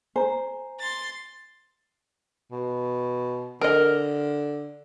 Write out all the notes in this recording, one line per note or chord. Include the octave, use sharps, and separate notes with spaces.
C5 G#5 A#5
C6 A6
B2
D3 A#4 D#5